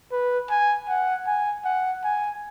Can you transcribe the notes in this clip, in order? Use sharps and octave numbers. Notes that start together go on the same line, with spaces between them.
B4
G#5
F#5
G#5
F#5
G#5